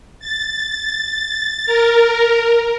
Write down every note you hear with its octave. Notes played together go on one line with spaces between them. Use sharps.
A6
A#4